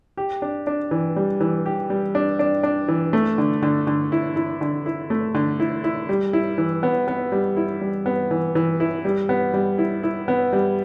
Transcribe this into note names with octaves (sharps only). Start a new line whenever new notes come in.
G4
D4
D4
E3
G3
E3
G4
G3
D4
D4
D4
E3
A3
D3
D3
D3
E4
E4
D3
E4
A3
D3
E4
E4
G3
E4
E3
B3
B3
G3
E4
G3
B3
E3
E3
E4
G3
B3
G3
E4
E4
B3
G3